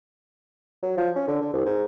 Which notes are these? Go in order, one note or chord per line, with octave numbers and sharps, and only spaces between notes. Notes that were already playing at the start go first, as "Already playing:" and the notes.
F#3
F3
C#4
D3
D3
C2
G#2